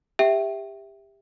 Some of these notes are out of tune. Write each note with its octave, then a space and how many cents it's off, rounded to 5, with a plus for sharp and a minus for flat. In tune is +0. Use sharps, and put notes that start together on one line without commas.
G4 +25 E5 +0 G5 -15